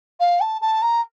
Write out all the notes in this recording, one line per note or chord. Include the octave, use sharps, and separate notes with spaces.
F5
A5
A5
A#5